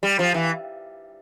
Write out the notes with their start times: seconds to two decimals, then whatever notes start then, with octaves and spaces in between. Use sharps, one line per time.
0.03 G3
0.19 F3
0.34 E3